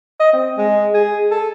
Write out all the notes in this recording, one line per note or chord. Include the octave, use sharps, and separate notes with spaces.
D#5
C4
G#3
G#4
A4